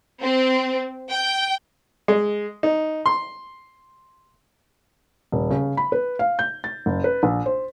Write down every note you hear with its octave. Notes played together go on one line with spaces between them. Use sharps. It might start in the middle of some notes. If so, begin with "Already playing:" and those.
C4
G5
G#3
D#4
C6
D#1
C#3
B5
B4
F5
G6
A6
F#1
B4
A#1
C5